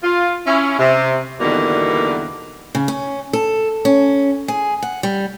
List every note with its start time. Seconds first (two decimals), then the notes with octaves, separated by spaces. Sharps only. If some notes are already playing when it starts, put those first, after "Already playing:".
0.03 F4
0.47 C#4 E4
0.79 C3
1.41 E2 B2 D3 D#3 G3 A#3
2.75 C#3
2.88 C#4
3.33 A4
3.85 C#4
4.48 G#4
4.82 F#5
5.03 G3